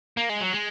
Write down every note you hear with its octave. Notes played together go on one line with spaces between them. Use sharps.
A#3
G#3
F#3
G#3